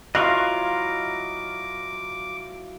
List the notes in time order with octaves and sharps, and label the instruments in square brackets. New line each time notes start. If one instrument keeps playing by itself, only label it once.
[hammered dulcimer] F#3 E4 F4 [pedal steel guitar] D#5 F5 C#6 [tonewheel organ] D6 [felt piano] F#6